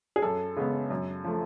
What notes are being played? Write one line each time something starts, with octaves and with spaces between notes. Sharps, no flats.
G#4
F#2 A4
C#3 G#3 B3
F#2
F3 A3